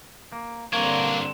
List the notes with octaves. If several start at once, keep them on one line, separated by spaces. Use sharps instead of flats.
A#3
G2 D3 A#3 C4 D4 A#4 C#5